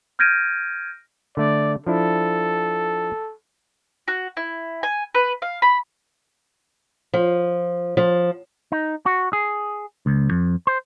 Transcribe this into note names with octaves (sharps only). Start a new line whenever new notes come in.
F6 G6 G#6 A#6 D7 D#7
D3 A3 D5
F3 D4 E4 A4
F#4
E4
G#5
B4
F5
B5
F3
F3
D#4
F#4
G#4
C#2
F2
C5